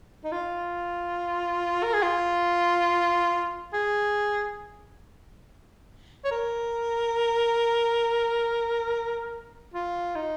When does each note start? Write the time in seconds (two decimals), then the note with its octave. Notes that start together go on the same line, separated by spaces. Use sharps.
0.24 D#4
0.32 F4
1.83 A#4
1.94 G#4
2.03 F4
3.73 G#4
6.25 C#5
6.31 A#4
9.74 F4
10.16 D#4